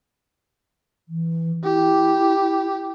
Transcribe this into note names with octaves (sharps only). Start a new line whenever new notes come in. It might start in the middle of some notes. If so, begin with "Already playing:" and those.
E3
E4 G4